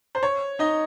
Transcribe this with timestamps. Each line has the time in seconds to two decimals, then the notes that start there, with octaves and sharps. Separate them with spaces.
0.15 C5
0.23 C#5
0.59 D#4 D#5